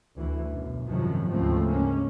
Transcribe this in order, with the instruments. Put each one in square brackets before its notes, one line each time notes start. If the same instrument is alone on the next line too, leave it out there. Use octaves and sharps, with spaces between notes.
[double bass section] D2 E3
B1 F#2
G#1 F#2 C3 D#3 F3 F#3
D2 G#2 C#3 F3 A3 C4
G#3 A#3 C#4